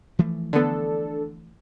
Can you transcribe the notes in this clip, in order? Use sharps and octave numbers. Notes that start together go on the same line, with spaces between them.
E3 F3 A3
D3 B3 D4 A4